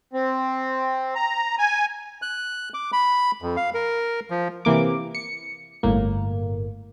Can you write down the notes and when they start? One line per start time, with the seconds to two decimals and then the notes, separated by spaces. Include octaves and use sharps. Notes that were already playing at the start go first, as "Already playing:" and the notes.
0.13 C4
1.15 A#5
1.58 G#5
2.22 F#6
2.74 D6
2.93 B5
3.42 F2
3.57 F5
3.74 A#4
4.30 F3
4.65 C3 E3 A#3 D6
5.15 C#7
5.83 G1 A2 A#3